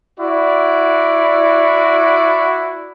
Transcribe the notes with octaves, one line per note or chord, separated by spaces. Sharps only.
E4 F#4 D5